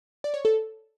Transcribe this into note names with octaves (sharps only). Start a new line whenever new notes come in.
D5
C#5
A4